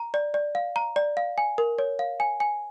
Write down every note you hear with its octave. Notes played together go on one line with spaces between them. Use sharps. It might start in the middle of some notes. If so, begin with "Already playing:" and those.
Already playing: A#5
D5
D5
F5
A#5
D5
F5
G#5
A#4
C#5
F5
G#5
G#5